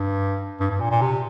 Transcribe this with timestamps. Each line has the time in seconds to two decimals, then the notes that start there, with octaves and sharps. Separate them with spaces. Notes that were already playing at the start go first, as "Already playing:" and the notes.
Already playing: G2
0.60 G2
0.71 G2
0.81 A#2
0.91 A#2
1.02 C3